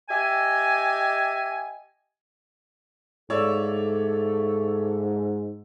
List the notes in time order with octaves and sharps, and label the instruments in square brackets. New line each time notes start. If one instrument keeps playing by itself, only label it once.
[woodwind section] G4 D#5 E5 G#5
[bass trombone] G#2 [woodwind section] A3 A#3 A4 [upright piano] C#5 D5 E6